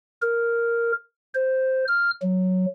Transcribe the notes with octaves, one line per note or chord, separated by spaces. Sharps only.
A#4
C5
F6
F#3